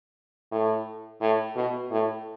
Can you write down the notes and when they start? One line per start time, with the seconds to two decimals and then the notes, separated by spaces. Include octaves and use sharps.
0.51 A2
1.21 A2
1.56 B2
1.91 A2